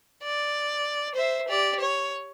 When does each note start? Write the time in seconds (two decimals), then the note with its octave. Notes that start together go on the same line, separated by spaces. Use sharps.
0.23 D5
1.14 C5 E5
1.48 G4 D5
1.80 C#5